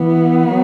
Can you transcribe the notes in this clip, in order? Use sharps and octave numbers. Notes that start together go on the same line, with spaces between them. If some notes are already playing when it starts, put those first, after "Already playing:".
Already playing: E3 B3
F#3